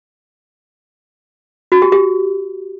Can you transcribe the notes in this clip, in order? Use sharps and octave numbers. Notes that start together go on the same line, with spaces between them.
F#4
G4
G4